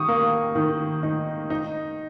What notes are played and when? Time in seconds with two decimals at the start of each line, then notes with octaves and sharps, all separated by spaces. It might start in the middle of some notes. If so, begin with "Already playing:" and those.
Already playing: D#3 C#6 D#6
0.08 A#3
0.55 D#3
1.03 D#4
1.50 D#4